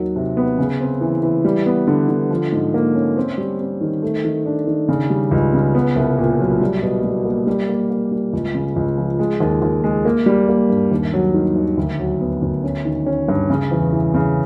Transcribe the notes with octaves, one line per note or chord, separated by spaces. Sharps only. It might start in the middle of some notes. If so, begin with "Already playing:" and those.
Already playing: D#2 D#3 F#3
C3
B3
C#3
C4
E3
E3
G3
B3
D3
D3
F3
G#2
A#3
C#4
C4
G3
C4
D#3
A3
D#3
D4
D#3
C#3
G3
C#2
C#3
B3
C2
A#2
F#3
G3
B2
G3
A#3
G3
A#3
A#3
G3
C#2
C#3
C#2
F3
G#3
D#2
D#2
G#3
A#3
G3
A#3
G2
D#2
F#3
D#3
D#2
D2
F#3
B3
D2
C#4
D#3
C#4
G2
C#3
E2
E3
C#3